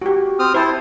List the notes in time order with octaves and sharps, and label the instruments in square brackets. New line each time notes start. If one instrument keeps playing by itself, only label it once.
[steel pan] F#4 G4
[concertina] C4 D#6 F6
[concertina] E4 [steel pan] C5 A5